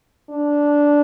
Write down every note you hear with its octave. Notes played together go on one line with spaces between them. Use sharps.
D4